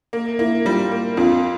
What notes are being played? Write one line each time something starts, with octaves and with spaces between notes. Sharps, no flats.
A#3
A#3 E4
G3 F4
A#3
F2 F4